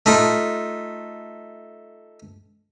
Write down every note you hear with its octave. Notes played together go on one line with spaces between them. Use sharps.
A3 D#4 F4